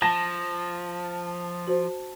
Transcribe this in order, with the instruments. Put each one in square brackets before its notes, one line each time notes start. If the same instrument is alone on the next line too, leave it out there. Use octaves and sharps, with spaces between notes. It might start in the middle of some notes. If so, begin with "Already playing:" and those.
[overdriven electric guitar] F3 [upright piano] A5 A#6 E7
[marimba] F#4 C5